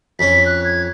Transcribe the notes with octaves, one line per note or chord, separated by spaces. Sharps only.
F2 C#4 B6
F#6
G#6